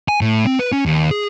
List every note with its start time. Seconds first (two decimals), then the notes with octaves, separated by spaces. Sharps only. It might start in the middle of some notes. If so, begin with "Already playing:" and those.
0.08 G#5
0.21 A2
0.46 C4
0.59 B4
0.72 C#4
0.86 D#2
1.11 G#4